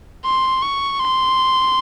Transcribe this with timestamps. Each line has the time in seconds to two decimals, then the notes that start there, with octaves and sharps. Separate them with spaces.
0.25 C6
0.62 C#6
0.98 C6